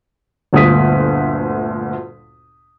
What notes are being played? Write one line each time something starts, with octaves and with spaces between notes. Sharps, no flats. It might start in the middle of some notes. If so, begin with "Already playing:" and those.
G1 D2 A#2 D#6 B6